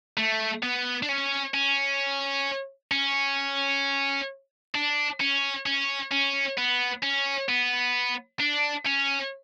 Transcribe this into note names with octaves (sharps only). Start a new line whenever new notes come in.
A3
B3
D4
C#4
C#4
C#4
D4
C#4
C#4
C#4
B3
C#4
B3
D4
C#4